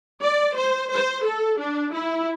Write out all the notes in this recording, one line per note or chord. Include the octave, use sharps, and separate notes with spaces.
D5
C5
C5
A4
D4
E4